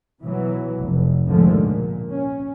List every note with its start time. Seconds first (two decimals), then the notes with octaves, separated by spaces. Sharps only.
0.21 B2 E3 F#3
0.78 F1
1.27 D#2 G#2 D3 F3 G#3 A3
1.62 A#2
2.10 C#4